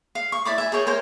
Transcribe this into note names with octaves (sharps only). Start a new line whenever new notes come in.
F5
C#6
E4 D5 B5 D6
E5 G#5
G#4 A#4 C#5 G5
A#4 C5 C#5 G5